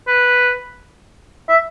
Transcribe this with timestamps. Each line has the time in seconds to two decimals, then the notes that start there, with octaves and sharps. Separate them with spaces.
0.08 B4
1.49 E5